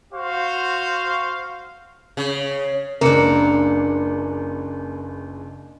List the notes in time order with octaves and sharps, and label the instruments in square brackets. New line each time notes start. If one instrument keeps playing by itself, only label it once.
[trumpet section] F#4 C5 F5
[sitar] C#3
[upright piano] F#1 C#2 [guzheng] A#3 D4 [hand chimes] A#4 C#7